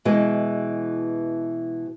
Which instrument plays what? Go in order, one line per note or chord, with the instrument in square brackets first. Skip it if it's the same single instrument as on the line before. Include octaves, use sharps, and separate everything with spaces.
[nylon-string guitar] B2 E3 G#3